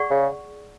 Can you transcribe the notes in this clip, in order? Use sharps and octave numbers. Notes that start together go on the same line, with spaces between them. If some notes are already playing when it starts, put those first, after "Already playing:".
Already playing: G#4 D5 F#5 C#6
C#3